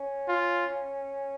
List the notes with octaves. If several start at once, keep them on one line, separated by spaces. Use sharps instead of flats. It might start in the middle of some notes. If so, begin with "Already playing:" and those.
Already playing: C#4
F4